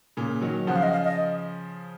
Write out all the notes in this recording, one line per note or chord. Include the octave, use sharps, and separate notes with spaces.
A#2 C#3
D#3 F#3
C#3 F3 F#5
F5
D#5
F5
D#5